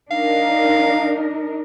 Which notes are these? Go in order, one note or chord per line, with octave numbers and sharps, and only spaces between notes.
D4 D#4 A#4 F5